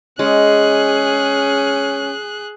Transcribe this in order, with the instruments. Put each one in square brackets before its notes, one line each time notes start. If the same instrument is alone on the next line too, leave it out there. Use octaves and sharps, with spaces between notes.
[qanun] G#3 [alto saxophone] C#4 [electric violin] G#4 F#6